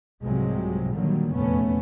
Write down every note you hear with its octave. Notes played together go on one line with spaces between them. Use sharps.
C2 G#2 C3 F3 F#3 G#3
A#2 D3 D#3 F#3 G3 A#3
F1 E2 A#2 A3 B3 C#4